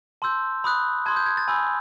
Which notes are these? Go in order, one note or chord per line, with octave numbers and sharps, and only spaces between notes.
A5 C6 E6 G6
B5 D#6 F#6
A5 C6 D#6 G#6
G6
G#6
A6
G#5 B5 E6 G6